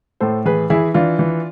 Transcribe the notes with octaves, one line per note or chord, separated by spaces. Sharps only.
A2 A4 C5
E3 G#4 B4
E3 E4 G#4
E3 D4 F4
E3